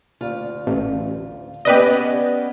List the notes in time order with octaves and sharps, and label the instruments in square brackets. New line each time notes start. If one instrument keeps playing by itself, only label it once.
[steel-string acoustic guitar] D2 F4
[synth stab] A1
[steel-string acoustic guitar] B3 C#4 D5 [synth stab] G4 B4 D#5